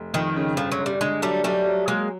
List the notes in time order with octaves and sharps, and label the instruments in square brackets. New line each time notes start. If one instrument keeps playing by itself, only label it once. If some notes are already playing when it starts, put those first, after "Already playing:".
Already playing: [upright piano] F1
[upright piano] F2 [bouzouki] D#3
[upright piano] C#3
[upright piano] G1 [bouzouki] F3
[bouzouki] F#3
[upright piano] G1
[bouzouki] G3
[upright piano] D3 [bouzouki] G#3
[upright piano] F#3 [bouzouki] G3 A3
[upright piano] B1 [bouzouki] G3 A3
[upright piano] F#3
[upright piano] F#3 [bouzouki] G#3 A#3